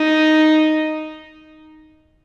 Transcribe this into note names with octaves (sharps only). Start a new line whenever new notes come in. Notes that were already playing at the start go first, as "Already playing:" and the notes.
Already playing: D#4